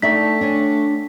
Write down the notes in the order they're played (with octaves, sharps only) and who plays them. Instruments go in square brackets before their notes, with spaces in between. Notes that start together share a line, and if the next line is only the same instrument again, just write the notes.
[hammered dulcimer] D3 G5 C#6 [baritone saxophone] A3 [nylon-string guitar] D#4 D5 E5 [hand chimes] B6
[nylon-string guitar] D4 C#5 G#5